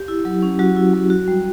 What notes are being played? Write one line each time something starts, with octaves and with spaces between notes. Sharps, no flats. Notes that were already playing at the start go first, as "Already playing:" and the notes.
Already playing: G4
E4
F#3
C#4
F#3 F#4
E4
F#3
F#4
G3